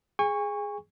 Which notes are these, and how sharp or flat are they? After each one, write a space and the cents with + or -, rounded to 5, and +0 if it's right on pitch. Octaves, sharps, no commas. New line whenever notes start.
G#4 +0 G#5 -40 C#6 +0